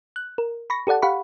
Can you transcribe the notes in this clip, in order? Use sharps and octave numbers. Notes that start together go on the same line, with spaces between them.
F#6
A#4
B5 C#6 A#6
G4 A4 D5 F#5 A5
G4 F5 F#5 B5 C#6